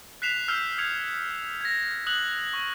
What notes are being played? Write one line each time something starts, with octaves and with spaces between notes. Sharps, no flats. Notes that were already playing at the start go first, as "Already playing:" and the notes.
F#6 B6 C7 E7 F7
E6 F6 G6 C7 F7
D#6 G#6 C#7 F7
G#6 A#6
D#6 F#6 F#7
C#6